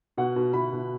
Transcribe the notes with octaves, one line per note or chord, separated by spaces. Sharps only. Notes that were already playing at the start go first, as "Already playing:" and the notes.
B2 F#5
B2
B2 B5
B2